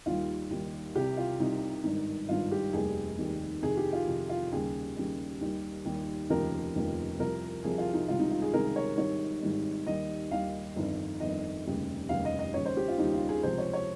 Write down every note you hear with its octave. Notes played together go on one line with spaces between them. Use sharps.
D#2 D#3 G3 F4
D#2 D#3 G3
C2 C3 G3 G4
F4
C2 C3 G3 D#4
G#1 G2 D#3
G#1 G2 D#3 F4
G4
F1 D#2 D#3 G3 G#4
F1 D#2 D#3 G3
F2 C3 D#3 G#4
G4
F4
F2 C3 D#3
F4
D#2 C#3 G3 G#4
D#2 C#3 G3
D#2 D#3 G3
D#2 D#3 G3
F1 D#2 C#3 F3 A#4
F1 D#2 C#3 F3
C2 C3 F3 A#4
C2 C3 F3 G#4
F4
D#4
C#2 C3 D#3 G3 F4
D#4
F4
G#4
C#2 C3 D#3 G3 A#4
C#5
G#1 G#2 D#3 G3 C#5
G#1 G#2 D#3 G3
D#2 D#3 G3 D#5
D#2 D#3 G3 F5
G1 F2 D#3
G1 F2 D#3 D#5
F1 D#2 C#3 G3
F1 D#2 C#3 G3 F5
D#5
D#5
D#2 C#3 G3 C#5
C5
G4
F4
D#2 C#3 G3 D#4
F4
G#4
C#2 C3 F3 C5
C#5
C#5